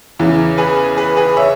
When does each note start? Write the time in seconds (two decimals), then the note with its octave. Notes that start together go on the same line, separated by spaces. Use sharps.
0.19 E2 C#3 E3
0.58 G#4 B4
0.97 G#4 B4
1.17 G#4 B4
1.37 C#5 E5